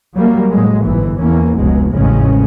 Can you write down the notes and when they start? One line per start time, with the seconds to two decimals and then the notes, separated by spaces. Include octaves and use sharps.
0.15 F#3 G3 A#3
0.51 A2 F#3 G#3
0.84 G1 G#2 E3
1.18 E2 E3 A#3 C#4
1.58 F1 C#2 B2 F#3 G#3
1.93 A1 F2 A2 C#3 G#3 C#4